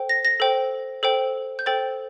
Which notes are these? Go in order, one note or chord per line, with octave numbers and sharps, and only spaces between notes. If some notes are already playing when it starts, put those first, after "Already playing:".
Already playing: A4 C5 G5
A#6
A#6
A4 C5 G5
A4 C5 G5
G6
A4 C5 G5 A6